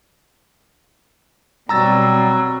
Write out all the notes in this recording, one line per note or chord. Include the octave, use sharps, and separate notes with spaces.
B2 F#3 G3 C4 A#5 E6 A6